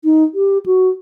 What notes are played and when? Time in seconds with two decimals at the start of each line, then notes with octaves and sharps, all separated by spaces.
0.04 D#4
0.35 G4
0.66 F#4